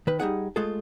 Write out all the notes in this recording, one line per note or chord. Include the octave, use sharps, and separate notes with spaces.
D#3 B4
G3 D#4 G#4 F#5
G#3 A3 F4 G#4 A4